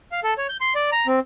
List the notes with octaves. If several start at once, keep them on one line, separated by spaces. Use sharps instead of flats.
F5
A4
C#5
G6
C6
D5
A#5
C4